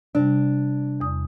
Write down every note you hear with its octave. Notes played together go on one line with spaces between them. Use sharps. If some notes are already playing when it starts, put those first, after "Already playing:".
C3 G3 D4
E2 D#6